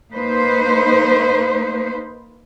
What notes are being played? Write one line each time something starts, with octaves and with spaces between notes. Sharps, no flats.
A#3 D#4 B4 C5